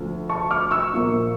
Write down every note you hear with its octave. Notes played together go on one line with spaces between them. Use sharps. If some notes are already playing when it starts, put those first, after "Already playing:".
Already playing: D2 D3 F3 A3
A5 C#6
D6 F6
C#6 E6
A#1 A#2 F3 A#3